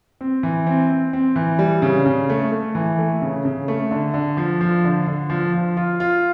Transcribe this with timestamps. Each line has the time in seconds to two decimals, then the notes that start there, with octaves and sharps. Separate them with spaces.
0.21 C4
0.43 E3
0.67 C4
0.89 C4
1.13 C4
1.36 E3
1.59 G3
1.82 C#3
2.06 C#3
2.29 A3
2.52 A3
2.75 E3
2.99 A3
3.22 C#3
3.45 C#3
3.68 A3
3.91 D3
4.14 D3
4.37 F3
4.61 F3
4.84 D3
5.07 D3
5.30 F3
5.53 F3
5.77 F4
6.00 F4